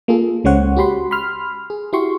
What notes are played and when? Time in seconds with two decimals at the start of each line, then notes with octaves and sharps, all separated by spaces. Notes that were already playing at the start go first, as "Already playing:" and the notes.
0.08 A#3 F4 G#4 A4
0.44 C#2 G#3 C#4 C5 C#5 F#5
0.76 F#4 G4 B5 C6
1.11 B5 C6 F6
1.70 G#4
1.93 E4 F#4 G4 C6 C#6